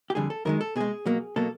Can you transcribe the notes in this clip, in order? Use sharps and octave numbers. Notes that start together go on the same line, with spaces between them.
G4
F2 D3 G3 G#4
A4
F#2 D#3 G#3 A#4
A4
B2 G#3 G#4
B2 F#3 A#3
B2 F#3 A#3 A4